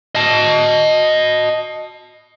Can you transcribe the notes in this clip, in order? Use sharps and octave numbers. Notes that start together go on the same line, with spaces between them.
D#5 A5